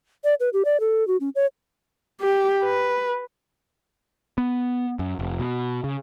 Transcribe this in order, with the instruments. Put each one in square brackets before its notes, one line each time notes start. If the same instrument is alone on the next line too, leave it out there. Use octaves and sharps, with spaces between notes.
[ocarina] D5
B4
G4
D5
A4
F#4
C#4
C#5
[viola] G4
B4
[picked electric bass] B3
F#2
F1
B2
C#3